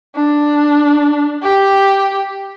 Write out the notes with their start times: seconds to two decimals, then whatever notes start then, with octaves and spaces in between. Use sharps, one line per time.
0.15 D4
1.43 G4